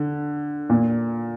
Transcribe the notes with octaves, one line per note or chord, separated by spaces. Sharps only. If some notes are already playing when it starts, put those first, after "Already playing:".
Already playing: D3
A#2